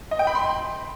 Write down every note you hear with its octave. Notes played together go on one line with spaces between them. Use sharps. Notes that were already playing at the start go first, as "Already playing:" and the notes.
D#5
G5
B5
C6